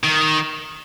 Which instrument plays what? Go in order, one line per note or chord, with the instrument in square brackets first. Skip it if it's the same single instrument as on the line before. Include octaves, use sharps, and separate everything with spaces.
[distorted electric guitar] D#3